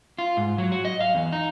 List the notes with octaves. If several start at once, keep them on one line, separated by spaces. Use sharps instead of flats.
F4
G#2
F#3
F#4
D#5
F5
E2
D#4